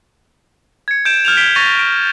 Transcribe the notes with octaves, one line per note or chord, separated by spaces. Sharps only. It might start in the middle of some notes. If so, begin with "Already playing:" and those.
G#6 C#7
G6 D7 E7
F6 G6 F7
B6 D7 G7
C#6 A6 A#6 C#7 D#7 F7
D7